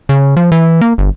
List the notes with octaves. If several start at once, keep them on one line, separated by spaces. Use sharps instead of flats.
C#3
F3
E3
A#3
G1